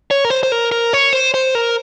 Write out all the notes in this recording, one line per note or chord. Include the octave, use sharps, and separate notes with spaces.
C#5
A#4
C5
C5
A#4
A#4
C#5
C5
C5
A#4